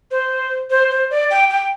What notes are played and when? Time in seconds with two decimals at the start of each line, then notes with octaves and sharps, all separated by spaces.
0.11 C5
0.70 C5
0.91 C5
1.10 D5
1.31 G5
1.50 G5